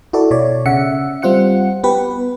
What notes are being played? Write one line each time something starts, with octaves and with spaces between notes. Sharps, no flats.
E4 F#4 A4 D5
B2 C#5 D5
C#3 E5 F#5 C#7
G3 C4 F4 F#5 C#7
B3 G4 B4